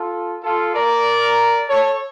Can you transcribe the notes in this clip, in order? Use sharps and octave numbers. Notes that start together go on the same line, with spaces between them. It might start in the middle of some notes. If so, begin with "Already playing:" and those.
Already playing: F4 A4
F4 A4
A#4 D5
A4 C#5